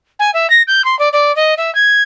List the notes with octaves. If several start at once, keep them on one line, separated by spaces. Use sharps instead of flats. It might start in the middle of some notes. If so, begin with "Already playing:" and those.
G#5
E5
A#6
G6
C6
D5
D5
D#5
E5
G#6